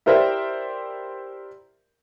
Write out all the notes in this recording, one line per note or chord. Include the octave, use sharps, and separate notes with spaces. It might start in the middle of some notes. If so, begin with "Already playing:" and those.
E4 G4 A#4 C5 D5 E5